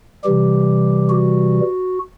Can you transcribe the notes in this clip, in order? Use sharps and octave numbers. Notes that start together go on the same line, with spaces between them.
C3 E3 G3 G4
F#4